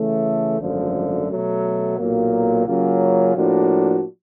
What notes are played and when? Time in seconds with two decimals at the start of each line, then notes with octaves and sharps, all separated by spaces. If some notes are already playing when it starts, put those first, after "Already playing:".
Already playing: C#3 E3 A3
0.60 G#1 F#2 D3 F3 A3
1.29 B2 F#3 A3
1.98 B1 A#2 F#3 A#3
2.66 C#3 F#3 A#3 C#4 F4
3.36 A2 F3 A#3 D4 F#4